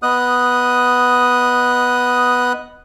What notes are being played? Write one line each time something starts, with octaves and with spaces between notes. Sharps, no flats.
B3 D#5 D#6 F#6